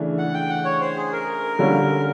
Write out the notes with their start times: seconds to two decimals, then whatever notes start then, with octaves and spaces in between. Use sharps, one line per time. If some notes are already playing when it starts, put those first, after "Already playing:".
Already playing: C#3 E3 A3 D4
0.18 F#5
0.34 G5
0.50 F#5
0.65 C#5
0.81 C5
0.97 G#4
1.12 A#4
1.59 D3 G3 A#3 C#4